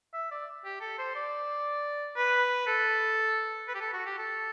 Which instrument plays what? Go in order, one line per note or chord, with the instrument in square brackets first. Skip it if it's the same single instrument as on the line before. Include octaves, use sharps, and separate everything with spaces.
[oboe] E5
D5
G4
A4
C5
D5
B4
A4
B4
G4
A4
F#4
G4
A4